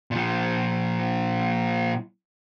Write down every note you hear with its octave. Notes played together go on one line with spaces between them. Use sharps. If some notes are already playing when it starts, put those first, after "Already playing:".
A#2 F3